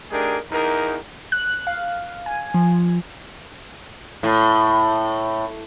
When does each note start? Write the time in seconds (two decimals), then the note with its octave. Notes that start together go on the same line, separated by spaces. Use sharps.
0.11 A3 D4 D#4 G4 G#4 A#4
0.52 E2 D#4 A#4
1.32 F#6
1.67 F5
2.26 G#5
2.54 F3
4.23 A2